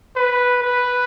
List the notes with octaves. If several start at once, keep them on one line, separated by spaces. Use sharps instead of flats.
B4
B4